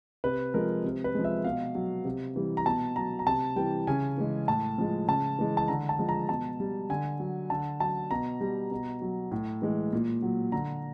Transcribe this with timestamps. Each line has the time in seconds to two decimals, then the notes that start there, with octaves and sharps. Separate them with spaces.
0.24 C3 B4
0.54 F3 G#3 A#4
0.84 C3
1.04 B4
1.15 F3 G#3
1.24 E5
1.44 B2 F5
1.75 F#3
2.05 C3
2.36 E3 G3
2.57 A#5
2.66 B2 A5
2.96 F#3 A#5
3.19 A#5
3.27 C3 A5
3.56 E3 G3 G5
3.87 C#3 G#5
4.18 E3 G#3
4.47 A2 A5
4.78 F3 G#3
5.08 C#3 A5
5.39 E3 G#3
5.57 A5
5.68 D3 A#5
5.89 A5
5.99 F3 G#3
6.09 A#5
6.29 B2 A5
6.60 G3
6.90 D3 G#5
7.20 F#3
7.50 D3 A5
7.80 F#3 A5
8.11 B2 A#5
8.41 G3
8.71 B2
9.02 F#3
9.31 A2
9.62 E3 G#3
9.93 A#2
10.22 F#3
10.52 D3 A#5